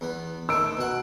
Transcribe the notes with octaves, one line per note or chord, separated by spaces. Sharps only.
E2 B3
D#3 A3 E6 D7
B2 F#5